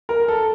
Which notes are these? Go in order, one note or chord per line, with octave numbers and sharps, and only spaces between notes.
A#4
A4